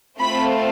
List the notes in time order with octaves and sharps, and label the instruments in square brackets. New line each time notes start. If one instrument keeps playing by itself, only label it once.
[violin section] A3 C4 F4 A4 B5